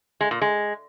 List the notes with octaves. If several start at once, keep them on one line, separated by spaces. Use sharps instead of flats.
G#3
A#2
G#3